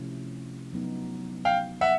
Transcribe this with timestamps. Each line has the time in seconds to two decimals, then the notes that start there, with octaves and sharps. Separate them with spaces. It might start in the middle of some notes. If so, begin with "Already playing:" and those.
Already playing: C3 F3 A3 C#4 E4
0.73 F#3 B3 D#4
1.45 F5 G5
1.81 E5 F#5